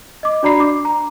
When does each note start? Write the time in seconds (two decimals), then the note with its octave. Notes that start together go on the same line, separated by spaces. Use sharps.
0.23 D#5 D6
0.43 D4 F#4 D5 A#5 B5 C7
0.60 D4 D6
0.85 A#5